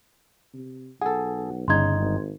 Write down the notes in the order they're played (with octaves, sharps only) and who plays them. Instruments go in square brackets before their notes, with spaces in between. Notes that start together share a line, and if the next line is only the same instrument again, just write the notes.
[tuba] C3
[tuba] B1 [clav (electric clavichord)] G#4 A4 [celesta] F#5
[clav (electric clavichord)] G1 D#4 [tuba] C#3 [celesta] C6 G#6
[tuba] G#1